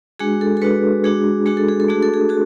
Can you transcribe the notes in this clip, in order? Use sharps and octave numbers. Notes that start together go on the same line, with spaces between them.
G#3 D4 F#4 G#4
A4
A4
G#3 D4 F#4 B4
G#3 D4 F#4 G#4
G#3 D4 F#4 G#4
A4
G#4
A4
A3 D4 F#4 G#4
A4
G#4
F#4 G#4